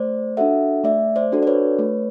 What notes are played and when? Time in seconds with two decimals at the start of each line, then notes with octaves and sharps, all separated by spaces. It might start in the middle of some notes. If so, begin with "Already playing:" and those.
Already playing: A3 C5 D5
0.37 D4 F#4 A4 E5 F#5
0.84 A3 D5 E5
1.16 C5 D5
1.32 D4 F#4 A4
1.43 D5
1.47 B4 C#5
1.79 A3